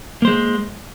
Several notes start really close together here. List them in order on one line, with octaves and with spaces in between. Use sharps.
A#3 C5 G#3